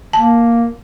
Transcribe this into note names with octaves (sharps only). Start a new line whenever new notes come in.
A#3 A5